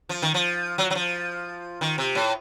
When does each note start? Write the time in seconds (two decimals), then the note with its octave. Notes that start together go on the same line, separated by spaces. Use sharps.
0.09 F3
0.22 D#3
0.34 F3
0.78 F#3
0.90 F#3
0.95 F3
1.81 D#3
1.98 C3
2.15 A2